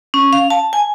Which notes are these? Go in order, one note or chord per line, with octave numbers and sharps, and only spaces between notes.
C#4
F5
A5
G#5